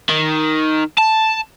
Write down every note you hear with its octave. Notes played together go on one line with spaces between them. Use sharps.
D#3
A5